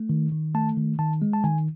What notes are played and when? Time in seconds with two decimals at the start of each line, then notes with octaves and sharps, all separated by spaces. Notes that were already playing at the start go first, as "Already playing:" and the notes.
Already playing: A3
0.09 D#3
0.32 D#3
0.55 A3 A5
0.77 D#3
0.99 D#3 A5
1.22 G#3
1.33 A5
1.44 D#3 G#5